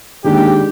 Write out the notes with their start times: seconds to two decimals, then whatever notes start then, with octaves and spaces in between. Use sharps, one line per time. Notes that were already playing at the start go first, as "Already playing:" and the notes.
0.24 D#2 D#3 G#3 D4 G4 G#4